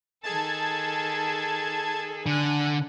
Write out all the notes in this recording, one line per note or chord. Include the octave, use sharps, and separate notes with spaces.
D#3 G#4 A4 A5 G#6
D3 G#5 F#6